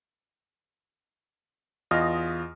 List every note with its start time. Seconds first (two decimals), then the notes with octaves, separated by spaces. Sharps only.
1.91 E2 F4 D#5 F6